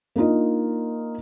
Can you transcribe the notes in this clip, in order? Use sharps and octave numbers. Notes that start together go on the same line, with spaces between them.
A#3 D4 D#4 F4 D#5